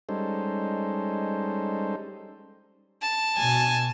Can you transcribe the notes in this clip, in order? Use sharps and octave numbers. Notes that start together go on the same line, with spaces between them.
G3 G#3 C#4 D#4 A4 C5
A5
B2 G#5